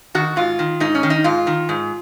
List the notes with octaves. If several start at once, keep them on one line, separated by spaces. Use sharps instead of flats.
D#3 F#4
G#2 F4
D#3
G#2 D#4
C#4
D#3
D#4
G#2 F4
D#3
G#2